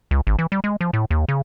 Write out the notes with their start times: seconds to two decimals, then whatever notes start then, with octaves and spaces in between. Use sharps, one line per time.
0.11 C#2
0.27 G#1
0.39 E3
0.52 G3
0.64 G#3
0.81 F3
0.93 A2
1.11 D#2
1.28 C#3